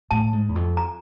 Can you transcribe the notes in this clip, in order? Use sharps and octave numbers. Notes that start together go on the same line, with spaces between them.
A2 A5
G#2
E2
F2
A#5